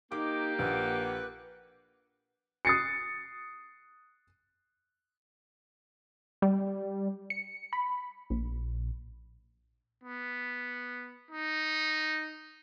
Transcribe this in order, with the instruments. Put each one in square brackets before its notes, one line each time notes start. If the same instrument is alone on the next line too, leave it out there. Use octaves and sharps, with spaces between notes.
[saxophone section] A#3 G4 [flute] D#4 [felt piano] D6
[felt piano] A#1 [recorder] B4 [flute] F#5
[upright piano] D#6 F#6 A6 C7 C#7
[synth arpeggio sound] G3
C#7
B5
A#1
[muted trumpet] B3
D#4